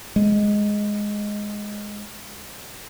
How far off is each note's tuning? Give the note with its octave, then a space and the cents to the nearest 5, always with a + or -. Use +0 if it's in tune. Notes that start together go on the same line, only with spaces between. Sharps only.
G#3 +0